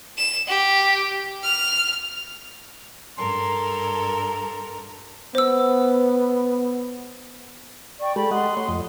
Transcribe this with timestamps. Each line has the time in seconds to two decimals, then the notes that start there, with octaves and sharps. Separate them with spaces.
0.18 E7
0.47 G4
1.43 F6
3.18 G2 A4 A#4 C6
5.35 B3 C5 E6
8.01 D5 G5 C#6
8.16 G#3 G4 A4 B5
8.31 D#5 F#5 C6
8.57 A3 C#5
8.68 F2 D#5